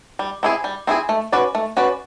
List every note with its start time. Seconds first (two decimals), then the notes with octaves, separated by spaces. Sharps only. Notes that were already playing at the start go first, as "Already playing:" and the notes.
0.19 G3
0.43 C4 E4 G#4
0.64 G3
0.87 C4 E4 G#4
1.09 A3
1.32 C#4 F#4 B4 D5
1.55 A3
1.77 C#4 F#4 B4 D5